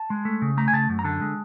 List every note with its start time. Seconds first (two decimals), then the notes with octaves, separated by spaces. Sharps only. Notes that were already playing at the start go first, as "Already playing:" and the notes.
Already playing: A5
0.10 G#3
0.25 A3
0.42 C#3
0.57 A3 A#5
0.68 G#5
0.73 C#3 A5
0.89 F#2
0.99 A#5
1.04 D3 A5
1.21 G#3